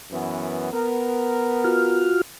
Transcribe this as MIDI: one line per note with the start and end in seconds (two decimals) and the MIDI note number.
0.11 0.69 42
0.11 0.69 52
0.11 0.69 59
0.72 2.14 59
0.72 2.14 70
1.64 2.21 65
1.64 2.21 66
1.64 2.21 89